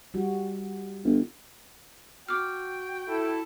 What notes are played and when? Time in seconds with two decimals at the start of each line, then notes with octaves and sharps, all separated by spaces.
0.14 G3 F#4
1.04 G1
2.29 F#4 G5 D6 F6
3.08 E4 A4